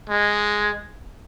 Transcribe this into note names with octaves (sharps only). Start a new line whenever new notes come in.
G#3